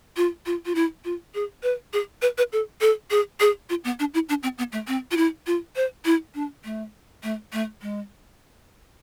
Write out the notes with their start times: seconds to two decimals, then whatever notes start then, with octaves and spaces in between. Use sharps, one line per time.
0.17 F4
0.46 F4
0.66 F4
0.75 E4
1.05 F4
1.34 G#4
1.63 B4
1.93 G#4
2.22 B4
2.38 B4
2.52 A4
2.81 A4
3.11 G#4
3.40 G#4
3.69 F4
3.84 B3
3.99 D4
4.14 E4
4.29 D4
4.43 C4
4.58 B3
4.72 A3
4.87 C4
5.11 F4
5.17 E4
5.47 F4
5.76 C5
6.05 E4
6.35 D4
6.64 A3
7.23 A3
7.53 A3
7.82 G#3